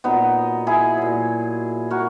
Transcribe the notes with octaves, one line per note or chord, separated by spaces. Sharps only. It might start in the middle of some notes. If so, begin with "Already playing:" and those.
A#2 F#3 B3 D#4
E4 G#4
A#2 F#3
A#2 F#4 A#4